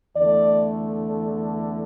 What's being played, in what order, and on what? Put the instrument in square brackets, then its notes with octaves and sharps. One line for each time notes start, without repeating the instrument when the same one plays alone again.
[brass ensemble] E2 D3 A3 D5